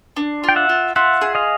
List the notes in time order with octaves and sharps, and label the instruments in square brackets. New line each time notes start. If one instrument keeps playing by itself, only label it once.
[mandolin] D4
[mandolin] F4 [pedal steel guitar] G5
[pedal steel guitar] E5 F#5
[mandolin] F4
[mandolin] F4 [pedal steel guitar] E5 F#5
[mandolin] G#4
[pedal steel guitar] D#5 F5